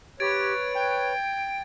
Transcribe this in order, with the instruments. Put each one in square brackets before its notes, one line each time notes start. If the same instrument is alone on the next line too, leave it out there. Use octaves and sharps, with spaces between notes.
[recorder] G4 [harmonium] B4 C#5 [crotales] G#6 A6 D7
[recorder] G5